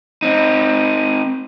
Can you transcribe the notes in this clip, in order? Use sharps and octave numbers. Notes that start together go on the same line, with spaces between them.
C4 D#4